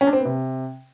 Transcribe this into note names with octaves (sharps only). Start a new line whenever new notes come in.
C#4
D4
C4
B3
C3